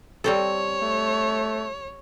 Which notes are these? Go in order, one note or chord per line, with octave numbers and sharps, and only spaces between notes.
G3 C4 A4 C#5
A3